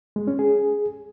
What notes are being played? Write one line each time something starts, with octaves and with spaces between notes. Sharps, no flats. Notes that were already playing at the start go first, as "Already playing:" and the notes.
G#3
C#4
G#4